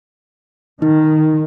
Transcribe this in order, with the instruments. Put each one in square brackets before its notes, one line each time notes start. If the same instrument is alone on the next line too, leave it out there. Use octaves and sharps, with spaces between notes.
[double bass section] D#3 [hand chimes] D#4